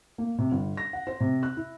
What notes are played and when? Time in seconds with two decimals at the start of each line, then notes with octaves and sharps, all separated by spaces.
0.18 A#3
0.39 C3
0.52 G1
0.77 A#6
0.93 F#5
1.07 C5
1.20 C3
1.43 F#6
1.57 E4